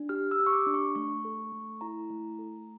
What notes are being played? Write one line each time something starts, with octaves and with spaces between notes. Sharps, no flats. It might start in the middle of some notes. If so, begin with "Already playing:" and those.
Already playing: D4
G4 F6
E6
G4
C#6
D6
D4
C#6
A3 C#6
A4
A3
E4 A#5
A3
A4